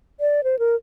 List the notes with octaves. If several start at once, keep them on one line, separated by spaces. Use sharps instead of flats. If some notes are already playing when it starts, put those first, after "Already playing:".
D5
C5
A#4